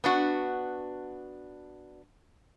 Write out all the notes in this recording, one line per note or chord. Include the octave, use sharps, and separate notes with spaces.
B3 D4 F#4